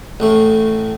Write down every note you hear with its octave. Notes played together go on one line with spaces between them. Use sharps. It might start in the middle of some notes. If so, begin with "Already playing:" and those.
A1 A2 A3